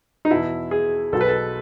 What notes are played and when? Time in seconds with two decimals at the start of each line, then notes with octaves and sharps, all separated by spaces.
0.25 D#4
0.31 E2 B2 E4
0.71 G#4
1.12 B1 B2 A4
1.21 B4
1.28 A4